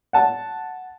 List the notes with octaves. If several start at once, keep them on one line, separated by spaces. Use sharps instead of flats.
F#5 A5